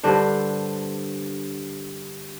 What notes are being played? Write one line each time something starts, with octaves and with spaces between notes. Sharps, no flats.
G2 D3 D4 C5